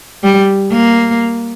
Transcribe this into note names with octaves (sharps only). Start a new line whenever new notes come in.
G3
A#3